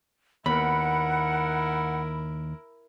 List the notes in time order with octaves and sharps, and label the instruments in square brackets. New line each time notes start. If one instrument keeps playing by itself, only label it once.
[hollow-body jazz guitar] D#2 B3 [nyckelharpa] E4 A#4 [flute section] F#5 [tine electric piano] B5